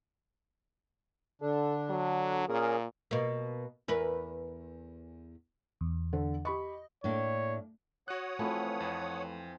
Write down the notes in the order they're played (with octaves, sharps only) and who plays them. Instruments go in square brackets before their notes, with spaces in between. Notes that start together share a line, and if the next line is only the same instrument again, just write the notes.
[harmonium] D3 D4 [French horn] A4
[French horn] F#3
[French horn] A#2 [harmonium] C#4 G#4 A#4
[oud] B2 A#3
E2 A#4 B4
[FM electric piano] E2
[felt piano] D3 A4
[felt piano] G4 B5 C#6 [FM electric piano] D#5
[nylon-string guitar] A2 A#3 D4 [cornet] C#5
[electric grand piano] F#4 F#6 [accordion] C#5 F#5 D#6
[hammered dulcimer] E3 F3 C4 [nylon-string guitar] A3 B4
[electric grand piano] F2